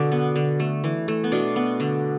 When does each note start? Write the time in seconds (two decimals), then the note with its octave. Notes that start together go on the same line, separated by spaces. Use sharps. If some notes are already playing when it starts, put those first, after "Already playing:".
Already playing: B2 D3 D4
0.12 B3
0.36 D3
0.60 A3
0.84 E3
1.08 A3
1.24 B3
1.32 B2 D4
1.56 B3
1.80 D3